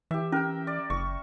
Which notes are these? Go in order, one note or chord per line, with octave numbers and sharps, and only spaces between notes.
E3 G4 E5
C#4 A#4 G5
D5
F#1 C#6